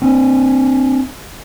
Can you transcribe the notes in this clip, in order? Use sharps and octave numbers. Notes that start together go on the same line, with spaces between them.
C4 D4